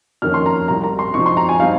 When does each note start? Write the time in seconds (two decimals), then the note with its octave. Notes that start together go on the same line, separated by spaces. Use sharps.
0.22 F2 D#3 A#3 C#4 F6
0.34 C6
0.46 A#5
0.68 C2 C3 G3 A#5
0.84 A#5
0.99 C6
1.14 C3 F3 C4 D#4 C#6
1.26 C6
1.37 A#5
1.49 G#5
1.60 G3 C4 D#4 F5